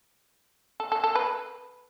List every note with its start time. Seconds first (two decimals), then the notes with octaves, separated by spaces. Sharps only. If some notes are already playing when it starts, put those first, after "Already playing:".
0.80 A4
0.92 A4
1.04 A4
1.15 B4